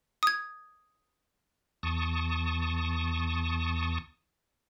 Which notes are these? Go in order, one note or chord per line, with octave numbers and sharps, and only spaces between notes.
D#6 G#6
E2 A5 C#6 D#6